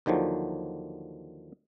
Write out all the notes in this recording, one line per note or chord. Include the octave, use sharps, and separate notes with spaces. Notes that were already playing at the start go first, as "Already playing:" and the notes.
D#2 D3 D#3 F3 F#3